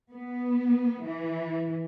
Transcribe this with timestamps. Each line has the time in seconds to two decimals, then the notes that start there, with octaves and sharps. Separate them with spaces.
0.12 B3
1.03 E3